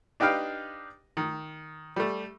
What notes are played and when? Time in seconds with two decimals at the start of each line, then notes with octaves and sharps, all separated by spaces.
0.20 D4 D#4 G4 B4 F5 G5
1.17 D#3
1.96 G3 A3